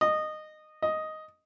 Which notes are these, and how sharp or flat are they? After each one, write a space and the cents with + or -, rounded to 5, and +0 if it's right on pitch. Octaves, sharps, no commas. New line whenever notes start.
D#5 -15
D#5 +5